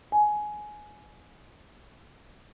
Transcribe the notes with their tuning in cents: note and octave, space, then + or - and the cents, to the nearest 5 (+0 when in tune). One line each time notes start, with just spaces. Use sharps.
G#5 +15